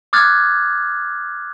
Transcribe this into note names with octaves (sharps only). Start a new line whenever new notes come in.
D6 D#6 F6 F#6 G#6 A6